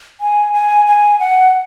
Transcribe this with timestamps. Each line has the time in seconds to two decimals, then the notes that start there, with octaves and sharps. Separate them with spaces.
0.21 G#5
0.53 G#5
0.87 G#5
1.20 F#5